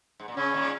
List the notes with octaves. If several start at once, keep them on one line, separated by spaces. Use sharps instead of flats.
G#2
A#2
C#3 C#4
A#2 D#3
G#3